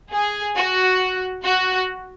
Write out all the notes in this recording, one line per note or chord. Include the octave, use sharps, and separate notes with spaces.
G#4
F#4
F#4